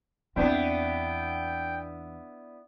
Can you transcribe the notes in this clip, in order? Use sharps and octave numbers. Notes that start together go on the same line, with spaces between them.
E2 B3 C4 D4 E4 G5